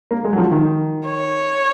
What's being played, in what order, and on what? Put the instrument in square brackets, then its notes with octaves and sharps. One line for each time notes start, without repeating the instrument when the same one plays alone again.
[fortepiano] A#3
G#3
F#3
F3
D#3
[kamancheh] C#5